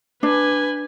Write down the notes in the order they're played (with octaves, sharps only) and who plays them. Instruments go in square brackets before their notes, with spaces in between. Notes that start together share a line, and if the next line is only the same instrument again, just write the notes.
[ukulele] D4 [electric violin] B4 G#5